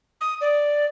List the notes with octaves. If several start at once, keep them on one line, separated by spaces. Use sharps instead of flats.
D#6
D5